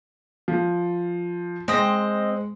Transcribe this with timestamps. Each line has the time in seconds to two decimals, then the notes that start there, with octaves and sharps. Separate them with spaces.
0.48 F3
1.68 G#3 C4 D#5